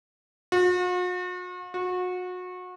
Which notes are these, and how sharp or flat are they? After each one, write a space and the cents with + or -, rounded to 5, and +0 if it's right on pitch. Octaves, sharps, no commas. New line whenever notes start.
F#4 -45
F#4 -30